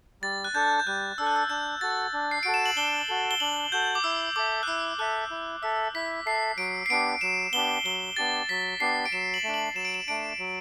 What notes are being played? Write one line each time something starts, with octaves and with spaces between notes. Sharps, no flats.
G3 A6
F#6
D4 A4 G6
G6
G3 F#6
D4 A4 E6
F#6
E6
D4 G6
F#4 A4 A6
D4
C7
F#4 A4 D7
E7
F#7
D4 G7
F#4 A4
G7
D4 F#7
F#4 A4 G6
D6
E4 E6
A4 E5 D6
F#6
E4 E6
A4 E5 F#6
E4
A4 E5 E6
E4 B6
A4 E5 C7
F#3 D7
C7
B3 D4 G4 D7
F#3 E7
B3 D4 G4 G7
F#3 G7
B3 D4 G4 A6
F#3 B6
B3 D4 G4 C7
D7
F#3 E7
F#7
A3 D4
F#7
F#3 E7
D7
E7
A3 D4 D7
F#3